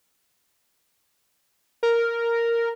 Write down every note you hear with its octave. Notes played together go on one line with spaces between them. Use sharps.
A#4